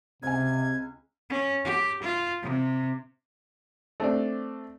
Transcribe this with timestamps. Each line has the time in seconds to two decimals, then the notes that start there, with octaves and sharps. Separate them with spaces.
0.23 C#2 C3 C4 G#5 G#6
1.30 C#4
1.65 G4
2.02 F4
2.42 C3
4.00 A3 C4 D4 D5